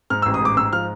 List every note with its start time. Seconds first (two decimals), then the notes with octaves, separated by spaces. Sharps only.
0.10 G#2 F6
0.22 E6
0.26 A1
0.34 D#6
0.42 G#2 D6
0.57 G#2 E6
0.73 F3 F6